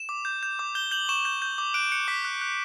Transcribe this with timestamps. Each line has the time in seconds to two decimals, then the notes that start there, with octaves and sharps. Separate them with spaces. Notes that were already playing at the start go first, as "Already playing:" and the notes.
Already playing: E7
0.09 D6
0.25 G6
0.43 G6
0.59 D6
0.75 G6 G7
0.91 G6 F#7
1.09 C#6 E7
1.25 G6
1.42 G6
1.58 D6
1.74 F#6 D7
1.92 F#6 C#7
2.08 D6 B6
2.24 F#6
2.41 F#6